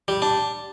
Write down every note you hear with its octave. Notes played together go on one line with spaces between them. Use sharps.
G3
D4